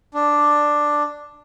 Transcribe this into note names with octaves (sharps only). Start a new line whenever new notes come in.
D4